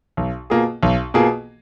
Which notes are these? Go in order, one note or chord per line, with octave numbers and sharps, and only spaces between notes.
B1
B2 A#3 F4 G#4
B1
B2 A#3 F4 G#4